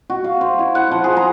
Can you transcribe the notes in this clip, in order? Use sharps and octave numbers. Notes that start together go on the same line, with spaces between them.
F#4
F5
C5
E4
F#5
F3
G#4
A#5